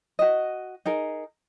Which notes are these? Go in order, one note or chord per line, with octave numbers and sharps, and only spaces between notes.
F#4 D#5
D#4 G#4 A#4